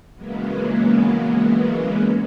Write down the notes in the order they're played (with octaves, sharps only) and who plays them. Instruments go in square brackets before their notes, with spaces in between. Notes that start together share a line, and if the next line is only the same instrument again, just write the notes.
[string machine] C#3 E3 F#3 G#3 A#3 B3